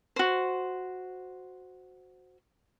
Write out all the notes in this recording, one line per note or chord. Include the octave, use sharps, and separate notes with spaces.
F#4 C5